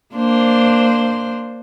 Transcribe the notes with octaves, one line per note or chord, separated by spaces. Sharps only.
A#3 D4 C5